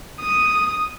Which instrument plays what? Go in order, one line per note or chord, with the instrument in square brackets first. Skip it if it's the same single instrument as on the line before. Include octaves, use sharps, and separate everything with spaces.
[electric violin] D#6